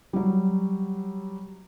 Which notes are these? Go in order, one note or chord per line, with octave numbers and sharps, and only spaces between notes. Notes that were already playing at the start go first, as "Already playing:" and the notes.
F#3 G3